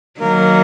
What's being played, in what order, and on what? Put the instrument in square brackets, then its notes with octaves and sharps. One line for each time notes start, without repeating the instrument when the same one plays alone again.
[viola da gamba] D#3 F#3 [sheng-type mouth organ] A#3 A#4